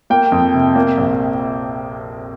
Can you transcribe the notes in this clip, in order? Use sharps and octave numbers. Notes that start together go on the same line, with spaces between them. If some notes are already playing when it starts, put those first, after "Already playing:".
A#3 G5
F2
C3
A#3
A#1